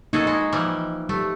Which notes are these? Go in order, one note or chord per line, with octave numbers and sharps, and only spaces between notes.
A#3 D#4 F#4 G#4 A4
G#3 D#4
E3 F3 G3
G3 A3